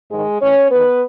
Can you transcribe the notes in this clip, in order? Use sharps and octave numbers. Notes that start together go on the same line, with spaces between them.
G#2 D#3 G#3 G#4
A2 E3 C#4 C#5
E2 D#3 B3 B4